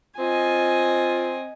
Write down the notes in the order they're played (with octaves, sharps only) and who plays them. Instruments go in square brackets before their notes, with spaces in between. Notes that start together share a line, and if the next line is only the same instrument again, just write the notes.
[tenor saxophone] C4 [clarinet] F4 [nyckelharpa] D#5 G#5